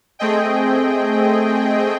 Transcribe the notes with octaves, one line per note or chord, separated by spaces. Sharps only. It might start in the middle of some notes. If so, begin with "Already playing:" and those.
A3 C4 G#4 D#5 G5